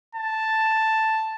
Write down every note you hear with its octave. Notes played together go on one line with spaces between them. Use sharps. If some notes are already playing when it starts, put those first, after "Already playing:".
A5